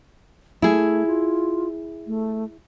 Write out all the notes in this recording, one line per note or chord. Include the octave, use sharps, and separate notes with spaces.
A3 E4 G#4
F4
A3